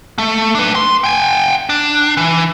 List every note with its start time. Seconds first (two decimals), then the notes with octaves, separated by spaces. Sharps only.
0.18 A3
0.55 D4 B4
0.75 C6
1.04 G5 G#5
1.69 D4
2.17 E3